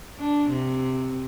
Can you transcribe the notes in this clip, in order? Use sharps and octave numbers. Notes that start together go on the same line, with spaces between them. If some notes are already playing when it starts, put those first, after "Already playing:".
D4
C3